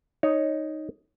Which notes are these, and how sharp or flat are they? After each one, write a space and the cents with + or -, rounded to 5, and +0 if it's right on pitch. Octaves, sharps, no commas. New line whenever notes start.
D#4 +0 C#5 +0